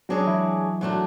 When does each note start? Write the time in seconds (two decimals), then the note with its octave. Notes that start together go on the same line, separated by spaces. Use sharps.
0.09 F#3 G#3 D4 F#4 G#4 C#5
0.27 E3 E4
0.81 G#2 F#3 A3 D4 F#4